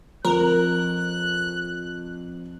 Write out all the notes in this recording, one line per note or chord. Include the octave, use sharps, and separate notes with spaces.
F2 A#4 F#6